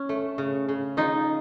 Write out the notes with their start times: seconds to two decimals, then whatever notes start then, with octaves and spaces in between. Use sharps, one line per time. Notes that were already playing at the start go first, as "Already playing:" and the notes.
Already playing: C#4
0.09 A3
0.38 C#3
0.69 C#3
0.97 F3 D#4